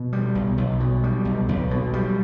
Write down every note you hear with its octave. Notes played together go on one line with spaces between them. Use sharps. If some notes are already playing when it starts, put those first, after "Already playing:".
Already playing: B2
G3
B1
B1
B2
G3
B1
B1
B2
G3